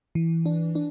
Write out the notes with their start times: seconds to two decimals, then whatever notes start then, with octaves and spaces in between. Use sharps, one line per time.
0.15 E3
0.46 D4
0.75 D4